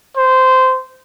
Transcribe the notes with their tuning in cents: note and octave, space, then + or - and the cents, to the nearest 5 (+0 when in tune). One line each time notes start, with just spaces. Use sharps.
C5 -15